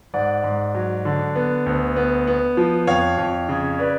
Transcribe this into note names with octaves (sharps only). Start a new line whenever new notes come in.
G#2 D5 F#5
G#2
F#3
D3
B3
D2
B3
B3
F3
F2 C#5 F5
F2
C#3
B4 D5